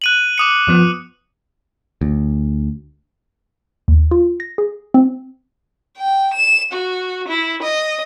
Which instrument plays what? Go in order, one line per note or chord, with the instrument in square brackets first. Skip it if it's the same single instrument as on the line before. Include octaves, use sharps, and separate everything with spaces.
[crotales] F#6 D#7 F#7
D6 D#6 C#7
[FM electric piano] F#2 F3 B3
[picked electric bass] D2
[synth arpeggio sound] D#2
F4
A#6
G#4
C4
[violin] G5
E7
F#4
E4
D#5